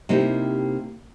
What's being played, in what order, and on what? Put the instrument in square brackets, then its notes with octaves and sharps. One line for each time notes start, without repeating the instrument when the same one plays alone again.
[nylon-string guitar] C3 A#3 D#4 E4 G4